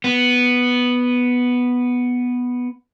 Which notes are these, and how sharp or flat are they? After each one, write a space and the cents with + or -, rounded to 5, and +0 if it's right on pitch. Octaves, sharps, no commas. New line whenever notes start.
B3 +0